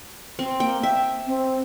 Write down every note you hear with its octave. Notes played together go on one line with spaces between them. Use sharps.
C4
A#3 G5
E5 G5
C4